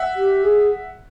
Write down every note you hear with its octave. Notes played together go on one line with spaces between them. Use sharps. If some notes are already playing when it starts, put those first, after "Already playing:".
Already playing: E5 F#5
G4
G#4